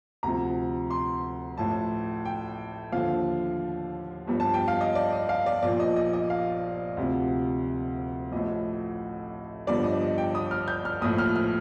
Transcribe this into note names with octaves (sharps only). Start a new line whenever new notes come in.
D2 C3 F3 A#5
C6
A1 A2 F3 A5
G5
D#2 D3 F3 F5
G1 G2 F3
A5
G5
F5
D#5
D5
D#5
F5
D5
A#1 A#2 F3 D5
D#5
D#5
D#5
F5
D2 C3 F3
A1 A2 F3 D#5
G1 G2 D3 F3 D5
D#5
D#5
G5
D#6
F6
G6
F6
A#1 A2 F3 D#6
F6
F6